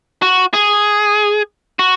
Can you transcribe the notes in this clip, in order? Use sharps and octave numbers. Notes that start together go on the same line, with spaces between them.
F#4
G#4
F#4